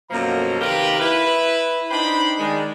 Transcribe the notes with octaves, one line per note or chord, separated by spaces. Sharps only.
F#2 B2 F3 A#3 A4 A#5
C3 D#3 G4 A#4 B4 F5
E4 B4
D4 D#4 C5 G5 B5
D#3 G#3 D4